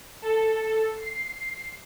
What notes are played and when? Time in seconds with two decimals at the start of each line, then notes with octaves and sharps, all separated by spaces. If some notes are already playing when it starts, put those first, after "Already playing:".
0.22 A4
0.96 C7